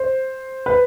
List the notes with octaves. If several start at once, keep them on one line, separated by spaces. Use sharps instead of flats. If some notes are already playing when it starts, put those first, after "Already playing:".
Already playing: C5
B4